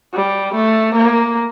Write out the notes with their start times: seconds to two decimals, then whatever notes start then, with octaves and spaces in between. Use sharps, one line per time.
0.14 G3
0.55 A3
0.95 A#3